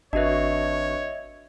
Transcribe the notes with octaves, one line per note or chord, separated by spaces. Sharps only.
G#1 D4 F#4 B4 C#5 D#5 E5